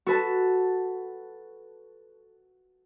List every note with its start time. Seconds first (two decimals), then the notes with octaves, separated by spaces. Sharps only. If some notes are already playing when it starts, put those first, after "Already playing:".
0.06 F#4 A4 B4 A5